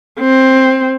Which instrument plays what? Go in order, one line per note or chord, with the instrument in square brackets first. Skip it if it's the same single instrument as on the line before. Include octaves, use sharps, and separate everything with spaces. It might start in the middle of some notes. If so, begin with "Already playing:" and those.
[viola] C4